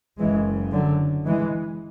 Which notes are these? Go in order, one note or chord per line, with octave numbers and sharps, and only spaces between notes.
F#1 F#2 C#3 E3 G#3
D3 F#3
E3 G#3